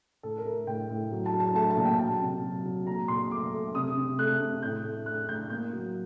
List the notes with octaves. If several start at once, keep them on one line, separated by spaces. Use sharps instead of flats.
A2 A4
A#4
A3
A2 G5
A2
F#3
A5
F#3
A5
A3 A5
A5
A#2
G5
F#3 A5
C3
F#3
F#3
A#2 A#5
A#2 C6
A3 D6
A3
C3 D#6
C3
A3 F#6
C3
A2 G6
A3
A3 F#6
A2 G6
A#3 G6
F#3